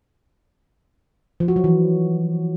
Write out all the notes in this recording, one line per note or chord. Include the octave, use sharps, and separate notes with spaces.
F3
F#4
F#3
E3